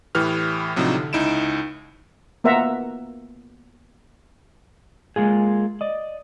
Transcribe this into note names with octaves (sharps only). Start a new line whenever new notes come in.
A2 E3 G4 B4 F6
A2 C3 F3 F#3 D4 D#4
D3
C#2 D#4 E4 D7 E7
A#3 B3 A#4 E5 F#5 A#5
G#3 A#3 F4 G#4
D5 D#5